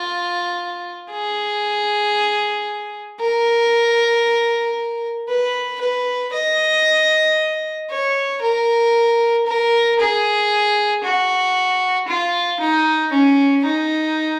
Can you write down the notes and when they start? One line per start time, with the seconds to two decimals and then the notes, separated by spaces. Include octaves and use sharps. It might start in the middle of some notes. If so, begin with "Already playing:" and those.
Already playing: F4
1.11 G#4
3.19 A#4
5.29 B4
5.81 B4
6.33 D#5
7.90 C#5
8.42 A#4
9.46 A#4
9.99 G#4
11.04 F#4
12.08 F4
12.60 D#4
13.12 C#4
13.65 D#4